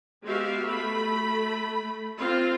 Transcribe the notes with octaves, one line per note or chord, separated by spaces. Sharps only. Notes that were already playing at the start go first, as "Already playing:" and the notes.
G#3 B3 F#4 G4 E5 F5
A3 B5
C4 F4 F5